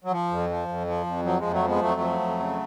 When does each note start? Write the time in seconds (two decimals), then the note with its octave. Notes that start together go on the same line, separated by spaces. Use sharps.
0.04 F#3
0.11 F3
0.31 F2
0.50 F3
0.68 F2
0.87 F3
1.06 F2
1.25 F3 F#3
1.39 F2 F3 G#3
1.53 F#3 A3
1.63 F3 G#3 B3
1.81 F2 F#3 A3
2.01 F3
2.20 F2
2.39 C#3